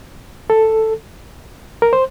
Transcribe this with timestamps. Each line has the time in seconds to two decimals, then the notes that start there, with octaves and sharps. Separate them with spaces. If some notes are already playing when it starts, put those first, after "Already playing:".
0.50 A4
1.82 A#4
1.93 C5